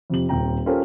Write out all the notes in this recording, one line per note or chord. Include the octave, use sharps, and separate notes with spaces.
F2 C3 F#7
D#1 C4 G5 A#5
C#4 F4 G4 A4 A#4 C5